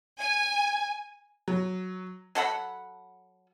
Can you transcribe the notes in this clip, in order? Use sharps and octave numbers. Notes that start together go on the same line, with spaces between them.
G#5
F#3
F#3 A4 F#5 B5